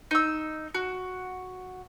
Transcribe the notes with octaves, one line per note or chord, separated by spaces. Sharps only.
D#4 E6
F#4